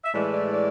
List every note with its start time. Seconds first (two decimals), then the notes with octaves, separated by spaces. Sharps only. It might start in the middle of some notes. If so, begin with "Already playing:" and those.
0.04 E5
0.12 A2 E3 G#3 D5
0.33 D5
0.53 D5